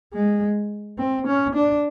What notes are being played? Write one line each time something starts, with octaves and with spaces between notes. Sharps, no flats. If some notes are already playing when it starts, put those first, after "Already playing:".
G#3
C4
C#4
D4